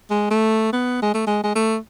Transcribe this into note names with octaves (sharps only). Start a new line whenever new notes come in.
G#3
A3
B3
G#3
A3
G#3
G#3
A3